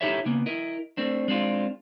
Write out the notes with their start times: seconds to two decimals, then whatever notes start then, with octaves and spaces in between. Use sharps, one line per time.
0.01 D#4 E4 G4 A4 C#5 E5
0.26 C#3 A#3 B3
0.46 E4 A#4 D#5
0.97 A3 C4 D4
1.28 G#3 C4 D4 F4